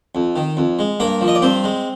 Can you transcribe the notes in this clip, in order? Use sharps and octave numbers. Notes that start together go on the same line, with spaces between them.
F2
D#3
F2
G#3
G2 A#3 A#4
F3
D#5
D5
G2 C4 C5
G#3